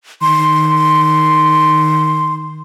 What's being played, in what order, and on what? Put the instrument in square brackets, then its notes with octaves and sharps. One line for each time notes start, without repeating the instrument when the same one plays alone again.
[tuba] D#3 [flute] C6